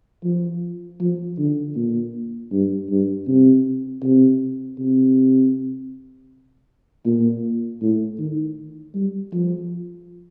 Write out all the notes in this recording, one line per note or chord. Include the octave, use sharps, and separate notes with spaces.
F3
F3
D3
A#2
G2
G2
C3
C3
C3
A#2
A2
D#3
G3
F3